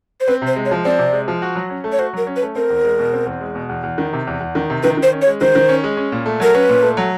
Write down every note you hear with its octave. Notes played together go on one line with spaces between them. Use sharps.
C5
C4 B4
C3
C5
G#3
C#5
F3
C4 D5
C3
G#3
F3
F#4
F#3
C#4
A3
C#5
F#4 C5
F#3 A#4
C#4
B4
A3
C4 A#4
E2
G#3
B2
C4
E2
G#3
B2
E2
E2
D#3
C3
E2
E2
D#3
C3
D#3 B4
D#3
C5
C#4
C#5
G#3
D#3 C5
D#3
C#4
G#3
C#4
A#2
A3
F#3 A#4
C#4 B4
A#2
A3
F#3